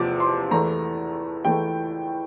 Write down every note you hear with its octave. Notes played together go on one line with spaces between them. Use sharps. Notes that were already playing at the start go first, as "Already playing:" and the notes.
Already playing: E2 C3 F3 D6
C6
E2 E3 A3 A#5
E2 E3 A3 G5